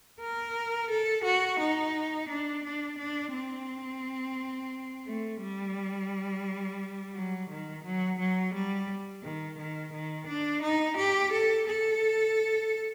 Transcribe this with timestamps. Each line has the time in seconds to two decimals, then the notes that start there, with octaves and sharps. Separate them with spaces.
0.21 A#4
0.90 A4
1.24 F#4
1.59 D#4
2.29 D4
2.64 D4
2.98 D4
3.33 C4
5.07 A3
5.41 G3
7.15 F#3
7.50 D#3
7.84 F#3
8.19 F#3
8.54 G3
9.23 D#3
9.58 D#3
9.93 D#3
10.27 D4
10.62 D#4
10.97 G4
11.32 A4
11.67 A4